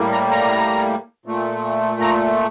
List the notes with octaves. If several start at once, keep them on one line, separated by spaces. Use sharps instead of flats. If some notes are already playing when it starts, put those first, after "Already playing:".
Already playing: A2 G3 A#3
A#5
A#5
A#2 A3
A#5